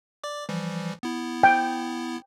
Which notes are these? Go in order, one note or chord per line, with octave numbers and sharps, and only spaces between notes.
D5 D6
E3 F3 G3
B3 E4
G5